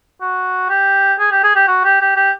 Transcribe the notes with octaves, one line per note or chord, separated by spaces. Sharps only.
F#4
G4
G#4
G4
G#4
G4
F#4
G4
G4
G4